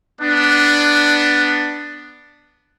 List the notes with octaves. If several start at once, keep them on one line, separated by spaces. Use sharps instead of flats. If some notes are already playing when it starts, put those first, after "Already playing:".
B3 D4